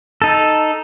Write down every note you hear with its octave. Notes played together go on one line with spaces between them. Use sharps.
D#4 A4